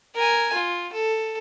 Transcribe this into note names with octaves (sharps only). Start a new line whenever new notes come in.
A#4 G#5
F4
A4